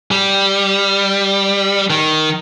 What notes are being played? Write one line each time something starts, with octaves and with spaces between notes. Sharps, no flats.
G3
D#3